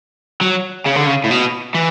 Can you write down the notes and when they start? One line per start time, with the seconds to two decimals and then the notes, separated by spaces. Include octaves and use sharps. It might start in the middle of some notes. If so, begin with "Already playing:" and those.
0.41 F#3
0.86 C#3
0.96 D3
1.06 C#3
1.24 A2
1.31 B2
1.75 E3